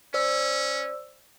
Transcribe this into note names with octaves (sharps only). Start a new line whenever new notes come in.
C#4 C5 D5 E6